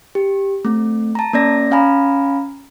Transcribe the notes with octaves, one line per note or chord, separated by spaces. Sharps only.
G4
A3 C4
A5 A#5
A#3 C#4 D5 A#6
C#4 F5 G#5 A#5 B5